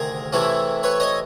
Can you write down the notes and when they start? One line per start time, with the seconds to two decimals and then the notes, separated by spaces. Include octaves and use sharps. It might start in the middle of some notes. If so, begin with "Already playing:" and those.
Already playing: D2 C3 D#3 G#4 A#4
0.32 C3 E3 A3 C#4 E4
0.83 B4 C#5
1.00 C#5 D#5